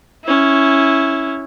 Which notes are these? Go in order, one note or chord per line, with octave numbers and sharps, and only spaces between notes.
C#4 E4